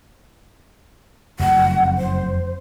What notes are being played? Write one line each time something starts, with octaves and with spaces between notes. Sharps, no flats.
F#1 F2 A3 F#5
C5